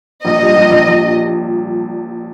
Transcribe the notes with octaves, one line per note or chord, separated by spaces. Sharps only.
A#1 D#5
G3
A#1
A#1
A#1